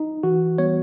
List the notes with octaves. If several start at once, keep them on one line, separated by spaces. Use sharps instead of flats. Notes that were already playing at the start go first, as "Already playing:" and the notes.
Already playing: D#4
E3 F#4
G3 B3 C#5